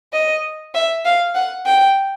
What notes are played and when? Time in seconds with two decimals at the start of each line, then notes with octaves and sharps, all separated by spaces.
0.13 D#5
0.74 E5
1.05 F5
1.35 F#5
1.66 G5